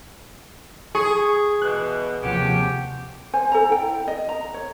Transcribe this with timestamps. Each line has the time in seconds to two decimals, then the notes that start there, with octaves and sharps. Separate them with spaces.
0.95 G#4 C#6
1.61 B2 E3 F#6
2.22 D#2 C3 F3 C#4 F#4 G4
3.33 C5 G#5
3.52 A4 A#5
3.70 E4 G5
4.08 D#5
4.29 A#5
4.54 C#5